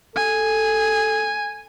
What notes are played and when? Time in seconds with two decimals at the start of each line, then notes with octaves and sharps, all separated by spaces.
0.16 A4 G#5